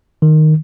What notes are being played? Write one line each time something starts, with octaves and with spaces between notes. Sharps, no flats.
D#3